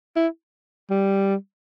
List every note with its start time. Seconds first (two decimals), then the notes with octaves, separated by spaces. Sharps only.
0.16 E4
0.90 G3